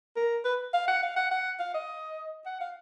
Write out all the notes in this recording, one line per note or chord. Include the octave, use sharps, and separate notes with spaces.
A#4
B4
F5
F#5
F5
F#5
F#5
F5
D#5
F#5
F5